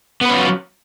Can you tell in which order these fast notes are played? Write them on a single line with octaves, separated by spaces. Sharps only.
B3 B4 C#4 F4 F#3